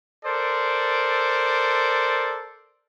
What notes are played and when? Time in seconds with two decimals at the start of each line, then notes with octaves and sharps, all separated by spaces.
0.25 A4 A#4 C5 D5